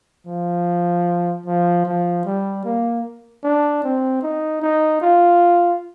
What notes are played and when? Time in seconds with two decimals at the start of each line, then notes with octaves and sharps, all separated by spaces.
0.27 F3
1.46 F3
1.86 F3
2.25 G3
2.65 A#3
3.44 D4
3.84 C4
4.23 D#4
4.62 D#4
5.02 F4